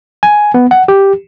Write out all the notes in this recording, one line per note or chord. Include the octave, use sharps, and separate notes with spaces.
G#5
B3
F#5
G4